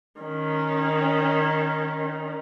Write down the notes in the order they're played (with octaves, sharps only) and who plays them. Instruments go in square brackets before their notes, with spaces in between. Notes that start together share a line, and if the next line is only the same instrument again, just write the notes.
[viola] D#3 C#4